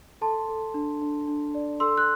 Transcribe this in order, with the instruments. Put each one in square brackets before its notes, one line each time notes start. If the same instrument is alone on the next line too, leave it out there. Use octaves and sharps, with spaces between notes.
[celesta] A4 A5 C6
A4
D4
D4
D4
D5
A4 C6 E6
F#6